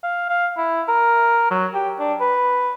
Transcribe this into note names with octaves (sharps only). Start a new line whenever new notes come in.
F5
F5
E4
A#4
F#3
G4
D4
B4